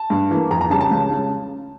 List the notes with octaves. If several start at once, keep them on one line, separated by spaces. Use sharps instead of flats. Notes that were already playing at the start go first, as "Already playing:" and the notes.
Already playing: A5
G2
E3 A#3
F2 A#5
A#5
C#3 G3 A5
A5
C#2
C#3